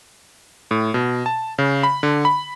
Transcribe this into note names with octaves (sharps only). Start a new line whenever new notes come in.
A2
B2
A5
C#3
B5
D3
B5